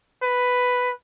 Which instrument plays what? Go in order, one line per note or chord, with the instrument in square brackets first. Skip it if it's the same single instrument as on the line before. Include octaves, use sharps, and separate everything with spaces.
[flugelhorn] B4